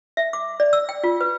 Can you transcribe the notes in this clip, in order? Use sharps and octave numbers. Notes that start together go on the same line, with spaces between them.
E5
D6
D5
E6
G5
F4
B4